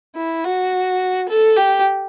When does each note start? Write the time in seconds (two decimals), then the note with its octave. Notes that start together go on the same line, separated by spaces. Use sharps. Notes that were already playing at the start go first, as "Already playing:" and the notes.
0.16 E4
0.44 F#4
1.28 A4
1.56 G4